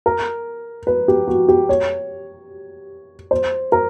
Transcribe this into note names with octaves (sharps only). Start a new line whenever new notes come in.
A#4
B4
G4
F#4
G4
C#5
C5
A#4